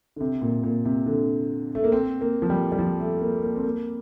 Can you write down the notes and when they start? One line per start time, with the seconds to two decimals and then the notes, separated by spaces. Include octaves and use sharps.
0.16 D3
0.20 C3
0.42 A#2
0.64 A#2
0.85 C3
1.06 D3
1.75 A3
1.84 A#3
1.92 C4
2.21 A#3
2.42 F3
2.50 G3
2.72 G3
2.79 F3
3.00 A3
3.21 A#3
3.43 A#3
3.56 C4
3.64 A#3